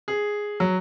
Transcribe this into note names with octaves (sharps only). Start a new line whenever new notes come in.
G#4
F#3